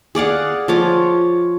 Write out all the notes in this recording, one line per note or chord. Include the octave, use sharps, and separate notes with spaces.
G#4 D5 F5 F#5
F3 F4 C#5 D6